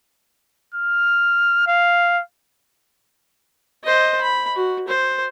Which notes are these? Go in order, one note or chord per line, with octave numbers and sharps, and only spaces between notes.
F6
F5
C5 D#5
B5
F#4
C5